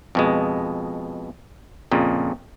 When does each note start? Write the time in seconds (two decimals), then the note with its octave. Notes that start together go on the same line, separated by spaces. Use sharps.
0.15 F2 B2 G#3
1.91 F2 A#2 C#3